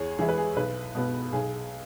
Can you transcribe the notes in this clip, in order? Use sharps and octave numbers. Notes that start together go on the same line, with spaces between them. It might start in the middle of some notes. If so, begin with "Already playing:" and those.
Already playing: E2 G#4 C#5
E3 G#3 E4 G#4
B4
G#4
B1 B4
B2 B3
B1 G#4